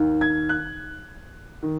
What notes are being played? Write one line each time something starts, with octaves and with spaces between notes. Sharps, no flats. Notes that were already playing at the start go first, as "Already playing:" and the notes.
Already playing: D#2 D#3
G#6
F#6
D#3